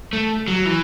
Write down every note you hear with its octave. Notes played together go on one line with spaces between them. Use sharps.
A3
F#3
E3